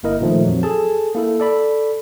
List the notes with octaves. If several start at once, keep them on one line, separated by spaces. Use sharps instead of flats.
G1 A#3 E4 A#4 D#5
A#2 D#3 F3 A3
F2 F#3
G#4 A4 A5
A#3 E4 A4
A4 D5 B5